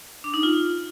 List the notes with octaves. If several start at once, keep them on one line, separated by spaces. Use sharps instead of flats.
D4
D#4
F4